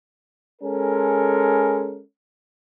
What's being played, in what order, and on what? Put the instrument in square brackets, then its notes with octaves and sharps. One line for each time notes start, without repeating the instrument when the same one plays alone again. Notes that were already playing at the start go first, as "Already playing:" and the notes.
[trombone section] G#3 C#4 A4 A#4